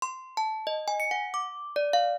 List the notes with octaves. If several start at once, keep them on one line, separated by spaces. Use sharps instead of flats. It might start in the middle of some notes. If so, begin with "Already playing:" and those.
C6
A5
D#5
G#5
C#7
F#5
D6
D5
F5